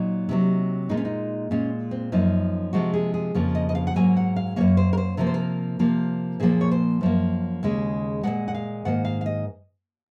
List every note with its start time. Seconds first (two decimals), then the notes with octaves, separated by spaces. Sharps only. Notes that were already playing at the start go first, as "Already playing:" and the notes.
Already playing: A#2 F#3 D#4
0.29 C3 D#3 F#3
0.89 A#2 G#3 D#4
0.97 C#4
1.05 D#4
1.51 A#2 G#3 C#4
1.91 C4
2.12 F#2 F3 A#3 D#4
2.73 C3 F3 G#3 F#4
2.94 G#4
3.14 G#4
3.35 F2 C#3 F3 A#3
3.55 D#5
3.69 D#5
3.75 F5
3.87 F#5
3.96 G#2 F#3 A#3 G#5
4.17 F#5
4.36 F5
4.56 F#2 F3 A#3 C#5
4.77 C5
4.93 A#4
4.98 C5
5.17 C3 F3 A#3 A#4
5.27 C5
5.34 A#4
5.79 C3 F3 A#3
6.40 A#2 F3 A#3 G#4
6.61 C#5
6.71 C5
7.01 F#2 F3 A#3
7.63 D#2 C#3 G#3
8.23 A#2 F3 G#3 F#5
8.48 F#5
8.55 F5
8.85 G#2 D#3 A#3 F#5
9.05 F5
9.21 F5
9.26 D#5